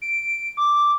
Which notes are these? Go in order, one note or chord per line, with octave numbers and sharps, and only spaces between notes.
D7
D6